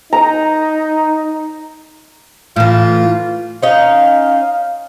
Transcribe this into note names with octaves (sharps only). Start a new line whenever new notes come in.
D#4 A#5
A2 E3 F4
C#4 D#4 F5